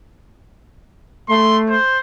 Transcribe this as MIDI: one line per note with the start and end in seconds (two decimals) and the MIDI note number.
1.29 1.74 57
1.29 1.58 84
1.69 1.99 72